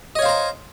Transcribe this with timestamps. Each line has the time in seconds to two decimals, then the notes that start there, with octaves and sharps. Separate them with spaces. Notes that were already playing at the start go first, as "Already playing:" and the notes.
0.15 D#5
0.19 C#5
0.22 F5
0.25 C5
0.29 A#5